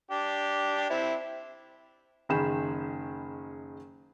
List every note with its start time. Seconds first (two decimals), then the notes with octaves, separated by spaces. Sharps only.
0.11 D4 G4
0.90 C4 E4
2.29 F#1 D#3 G#4 B5 G6 E7